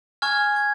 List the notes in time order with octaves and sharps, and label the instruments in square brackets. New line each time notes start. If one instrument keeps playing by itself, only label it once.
[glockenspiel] G#5 C#6 F6 G#6
G#6